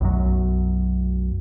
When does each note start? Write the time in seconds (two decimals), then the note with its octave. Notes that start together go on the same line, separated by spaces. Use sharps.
0.01 B1 F#2 F#3